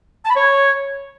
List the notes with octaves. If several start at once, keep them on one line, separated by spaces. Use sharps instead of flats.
A5
B5
C#5